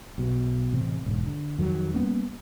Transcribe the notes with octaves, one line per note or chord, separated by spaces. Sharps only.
B1 B2
A1 C3
E1 G#2
D3
F2 D#3 F#3
G3 A#3 B3 C#4